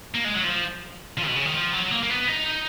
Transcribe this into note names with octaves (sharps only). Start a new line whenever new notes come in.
A#3
G#3
F#3
F3
F3
B2
C#3
D#3
F3
F#3
A#3
A#3
B3
D#4